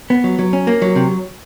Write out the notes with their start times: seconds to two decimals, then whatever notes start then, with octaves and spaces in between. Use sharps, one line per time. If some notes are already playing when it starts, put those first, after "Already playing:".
0.10 B3
0.24 F#3
0.39 F#3
0.53 C#4
0.67 A#3
0.82 F#3
0.95 C3